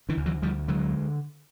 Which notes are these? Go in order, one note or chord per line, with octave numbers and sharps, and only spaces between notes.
D3 E3
D2
E3 F#3
D2 F3 G3
D3 F#3 G#3